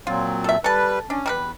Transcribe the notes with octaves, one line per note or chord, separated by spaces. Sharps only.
A#2 F#3 C4 F4
A4 E5
G3 A4 B4 A5
C#4 D4
E2 G3 A#4 B4